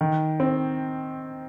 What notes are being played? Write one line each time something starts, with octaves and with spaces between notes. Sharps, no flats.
D#3
C4